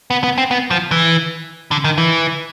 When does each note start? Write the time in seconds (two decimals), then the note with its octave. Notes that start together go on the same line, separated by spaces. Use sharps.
0.10 B3
0.24 B3
0.38 C4
0.51 B3
0.71 F3
0.91 E3
1.71 D3
1.84 D#3
1.98 E3